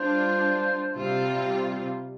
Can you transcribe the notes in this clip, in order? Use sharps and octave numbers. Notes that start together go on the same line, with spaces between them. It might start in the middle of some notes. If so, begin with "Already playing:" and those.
Already playing: G3 D4 F4 C5
C3 G3 C4 F4